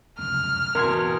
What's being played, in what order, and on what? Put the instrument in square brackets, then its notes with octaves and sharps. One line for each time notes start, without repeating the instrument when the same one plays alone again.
[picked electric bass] F1 C#2 F#2 [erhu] F6
[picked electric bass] G#1 E3 [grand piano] E2 B2 [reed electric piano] A#4 C6 G#6